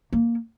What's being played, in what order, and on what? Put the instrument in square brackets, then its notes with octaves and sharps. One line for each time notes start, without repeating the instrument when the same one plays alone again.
[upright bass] A#3